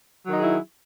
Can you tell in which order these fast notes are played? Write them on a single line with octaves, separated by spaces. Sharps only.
F#3 D#3 D#4 G#4 E4